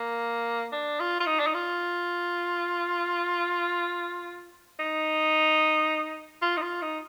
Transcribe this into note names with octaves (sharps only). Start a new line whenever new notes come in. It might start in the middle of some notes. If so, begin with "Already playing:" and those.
Already playing: A#3
D4
F4
F4
D#4
D4
D#4
F4
D#4
F4
D#4
F4
D#4